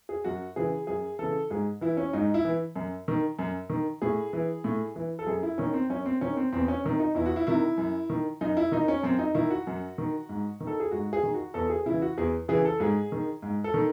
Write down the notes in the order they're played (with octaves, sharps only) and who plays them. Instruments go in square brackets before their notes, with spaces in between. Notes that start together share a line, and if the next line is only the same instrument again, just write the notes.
[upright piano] G#4
F#2 F#4
C#3 E3 G#4
F#2 G#4
C#3 E3 A4
G#2 G#4
E3 E4
C#4
G#2 D#4
E4
E3
F#2
D#3
F#2
D#3
A2 G#4
E3
A2
E3
A4
F#2 G#4
E4
D#3 C#4
C4
F#2 C#4
C4
D#3 C#4
C4
E2 C4
C#4
C3 D#3
D#4
E2 E4
F#4
E4
C3 D#3 E4
F#2
D#3
F#2 D#4
E4
D#3 D#4
C#4
F#2 C4
D#4
D#3 E4
F#4
F#2
D#3
G#2
D#3
A4
G#4
G#2 F#4
G#4
D#3
F#4
E2 A4
G#4
C#3 E3 E4
F#4
E2 G#4
C#3 E3 G#4
A4
G#2 G#4
D#3
G#2
A4
D#3